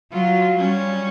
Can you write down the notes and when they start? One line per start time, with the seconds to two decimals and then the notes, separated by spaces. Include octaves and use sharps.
0.13 F#3 F4
0.58 G3 C#4